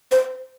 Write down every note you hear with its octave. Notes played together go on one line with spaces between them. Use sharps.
C5